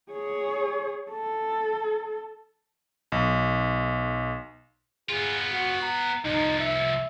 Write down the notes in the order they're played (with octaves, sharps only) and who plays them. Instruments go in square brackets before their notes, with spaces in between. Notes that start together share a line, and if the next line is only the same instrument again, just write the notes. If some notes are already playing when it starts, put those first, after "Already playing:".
[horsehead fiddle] G#4 C#5
A4
[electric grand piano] B1
[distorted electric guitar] B3 F4 [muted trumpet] G#4
[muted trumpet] F#4
A#5
[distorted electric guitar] C2 F3 [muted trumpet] D#4
[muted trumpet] E5